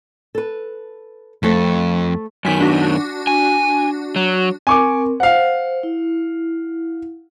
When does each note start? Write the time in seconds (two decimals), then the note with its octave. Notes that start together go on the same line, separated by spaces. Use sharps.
0.35 A4 B4
1.43 F2 A3 A4 C5
2.45 F#2 D#3 G#5 B6
2.60 D4 F#4
3.27 G#5
4.16 F#3
4.67 C4 A#4 G#5 C#6 D6
5.20 C5 F5 F#5
5.83 E4